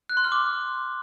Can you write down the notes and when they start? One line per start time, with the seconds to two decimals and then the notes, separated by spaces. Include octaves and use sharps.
0.09 F#6
0.17 C6
0.24 F6
0.32 D6